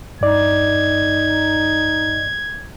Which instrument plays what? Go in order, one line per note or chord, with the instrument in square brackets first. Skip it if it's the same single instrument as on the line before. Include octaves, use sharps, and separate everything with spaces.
[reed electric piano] G2 D5 [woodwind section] D#4 [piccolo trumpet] G#6